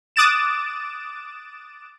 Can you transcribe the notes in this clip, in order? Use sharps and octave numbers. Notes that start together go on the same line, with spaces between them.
D6 D#6 F#6 A6 D7 E7